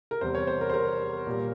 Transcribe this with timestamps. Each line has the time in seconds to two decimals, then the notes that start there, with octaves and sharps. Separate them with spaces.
0.11 A#4
0.21 E2 C3 G3 C5
0.35 C#5
0.47 C5
0.61 A#4
0.70 C5
0.74 A#4
1.27 A#2 G3